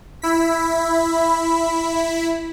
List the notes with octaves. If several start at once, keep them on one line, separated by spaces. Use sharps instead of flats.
E4 B6